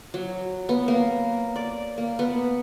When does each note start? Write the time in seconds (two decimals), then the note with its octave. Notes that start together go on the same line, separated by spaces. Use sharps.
0.14 F#3
0.69 B3
0.88 A#3
1.56 D5
1.98 A#3
2.19 B3